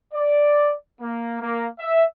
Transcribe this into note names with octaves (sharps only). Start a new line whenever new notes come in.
D5
A#3
A#3
E5